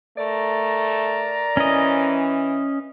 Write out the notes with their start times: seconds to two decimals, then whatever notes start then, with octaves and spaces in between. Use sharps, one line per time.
0.18 A3 A#4 D5 A#5
1.57 E3 C#4 D#5